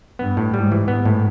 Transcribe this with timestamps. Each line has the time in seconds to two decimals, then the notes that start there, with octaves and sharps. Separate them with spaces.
0.19 G2 B3
0.37 A2
0.54 G#2 G3
0.72 E3
0.88 G#2 B3
1.05 A2